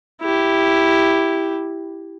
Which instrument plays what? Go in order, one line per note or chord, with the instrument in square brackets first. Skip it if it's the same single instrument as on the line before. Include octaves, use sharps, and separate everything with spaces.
[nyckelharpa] E4 G4